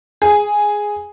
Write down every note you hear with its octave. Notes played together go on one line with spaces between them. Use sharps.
G#4